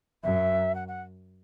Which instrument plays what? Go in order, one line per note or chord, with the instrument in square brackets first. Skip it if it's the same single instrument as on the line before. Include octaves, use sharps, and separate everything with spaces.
[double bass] F#2 [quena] E5
[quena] F#5
F#5